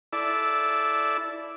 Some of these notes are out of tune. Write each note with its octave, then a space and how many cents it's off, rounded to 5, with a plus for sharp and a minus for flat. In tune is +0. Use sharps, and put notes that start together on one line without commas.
E4 +0 A4 -15 D5 -5